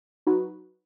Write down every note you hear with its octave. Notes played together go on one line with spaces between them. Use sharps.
F#3 D#4 F#4 B4